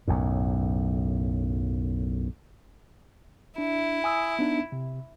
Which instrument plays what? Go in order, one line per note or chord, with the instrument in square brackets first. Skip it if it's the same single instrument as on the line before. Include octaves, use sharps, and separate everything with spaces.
[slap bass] B1 F#2 A2
[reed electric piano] D4 [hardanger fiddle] E4
[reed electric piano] G#5 D#6 E6
B3 D4 D#4
C3